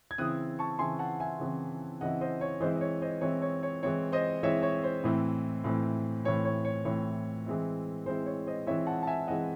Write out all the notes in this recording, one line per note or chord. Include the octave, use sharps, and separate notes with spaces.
G#6
C#3 E3 C4 E4 D#6 F#6
A5 C#6
C#3 E3 C4 E4 G#5 C6
F#5 A5
E5 G#5
C#3 E3 C4 E4
C#3 E3 C4 E4 D#5 F#5
C5 D#5
C#5
E3 G#3 C4 E4 C5 D#5
D#5
C#5
C5 D#5
E3 G#3 C4 E4 C#5
C#5
C#5
E3 G#3 C4 E4 C#5
C5 D#5
E3 G#3 C4 E4 C#5 E5
C#5
C5
A2 E3 C4
A2 E3 C4
A2 E3 C4 C#5
C#5
C#5
A2 E3 C4 C#5
E3 G#3 C4 E4
E3 G#3 C4 E4 C5
C#5
C5 D#5
E3 G#3 C4 E4 C#5 E5
F#5 A5
A5
E5 G#5
E3 G#3 C4 E4 D#5 F#5